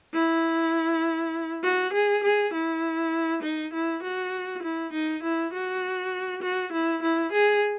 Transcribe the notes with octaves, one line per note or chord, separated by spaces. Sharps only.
E4
F#4
G#4
G#4
E4
D#4
E4
F#4
E4
D#4
E4
F#4
F#4
E4
E4
G#4